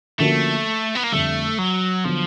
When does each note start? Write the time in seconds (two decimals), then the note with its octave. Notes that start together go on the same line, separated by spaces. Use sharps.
0.20 D3 F3 A3 A#3 C#4 F#4
0.95 B3
1.04 A#3
1.12 F2 D3 G3 A3
1.59 F#3
2.05 D3 F3 F#3 B3